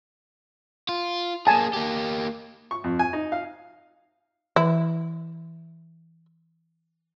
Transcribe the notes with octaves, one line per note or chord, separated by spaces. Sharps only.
F4
A#3 G#4 G#5 A5
A#3 G4
C#6
F2
G#5
D#4
F5
E3 E4